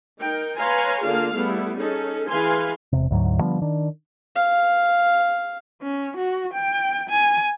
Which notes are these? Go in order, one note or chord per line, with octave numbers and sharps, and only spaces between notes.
D#4 A#4 G5
B4 C#5 F5 G#5 A#5 C6
D3 A#3 D4 F4 G#4 F5
G3 A3 B3 E4
C#4 D#4 G#4 A4
E3 G#4 B4 F5 G#5 C6
E1 C3
D2 G#2 F#3
D3 F3 G3 B3
D#3 D4
F5
C#4
F#4
G5
G#5